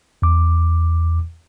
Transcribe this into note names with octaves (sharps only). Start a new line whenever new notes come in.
E2 D6